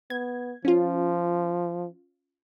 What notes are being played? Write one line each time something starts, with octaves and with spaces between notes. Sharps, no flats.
B3 G#6
F3 C#4 F4